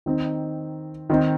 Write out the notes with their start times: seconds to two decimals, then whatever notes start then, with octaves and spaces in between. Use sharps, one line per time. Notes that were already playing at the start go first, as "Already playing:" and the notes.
0.06 D#3 C4 D#4
1.10 D#3 C4 D#4